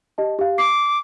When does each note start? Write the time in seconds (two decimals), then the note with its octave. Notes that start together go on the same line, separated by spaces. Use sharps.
0.18 G4 D#5 A5
0.39 G4 F5
0.58 D6 C7